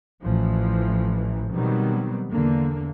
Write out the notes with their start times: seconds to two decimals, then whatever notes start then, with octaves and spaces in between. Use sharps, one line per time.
0.23 A1 E3 F3
1.53 B2 D#3 F#3 G3 B3 C4
2.31 E2 D3 A#3